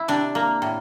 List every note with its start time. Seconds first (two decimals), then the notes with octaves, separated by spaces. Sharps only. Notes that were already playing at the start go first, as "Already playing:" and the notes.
Already playing: E4
0.08 C3 D4
0.35 A#3
0.62 A2